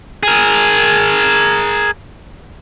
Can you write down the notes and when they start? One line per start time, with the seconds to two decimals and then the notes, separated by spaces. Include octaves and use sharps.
0.23 G#4 A#4